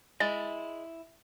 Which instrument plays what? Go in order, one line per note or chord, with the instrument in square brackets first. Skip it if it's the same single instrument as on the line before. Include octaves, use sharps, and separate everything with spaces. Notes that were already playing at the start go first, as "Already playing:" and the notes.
[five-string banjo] G#3 [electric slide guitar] E4 [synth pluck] A6